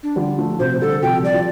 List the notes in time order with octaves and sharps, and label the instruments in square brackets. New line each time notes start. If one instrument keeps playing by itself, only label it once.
[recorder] D4
[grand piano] D3 G3 [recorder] F4
[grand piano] F3 A3
[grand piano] C3 F3 [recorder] C5
[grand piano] D3 G3 [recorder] A4
[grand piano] C3 F3 [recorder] G5
[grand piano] G3 [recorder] D5
[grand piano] F3